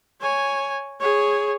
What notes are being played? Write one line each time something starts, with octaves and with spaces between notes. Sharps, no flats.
C#5 G#5
G#4 C#5